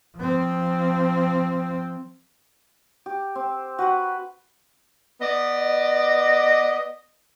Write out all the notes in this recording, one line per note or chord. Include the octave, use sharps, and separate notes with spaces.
F3 C4
G4
C4
F#4 B4 B5
B3 D5 D#5